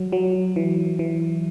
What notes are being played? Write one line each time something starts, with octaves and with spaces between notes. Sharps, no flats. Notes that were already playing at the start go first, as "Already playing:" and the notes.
Already playing: F#3
F#3
E3
E3